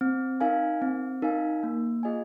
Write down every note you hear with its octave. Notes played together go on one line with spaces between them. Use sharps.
C4
D#4 A#4 F5 G#5
C4
D#4 A#4 F5 G#5
A#3
F4 G#4 D#5 G#5